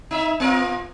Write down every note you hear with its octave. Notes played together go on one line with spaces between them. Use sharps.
D#4 E5
B3 F4 A#4